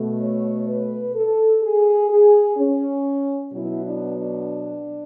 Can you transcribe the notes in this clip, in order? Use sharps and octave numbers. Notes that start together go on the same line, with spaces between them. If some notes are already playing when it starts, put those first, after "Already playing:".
Already playing: B2 A3
C#5
B4
A4
G#4
G#4
C#4
B2 F#3 B3 E4
D4
D4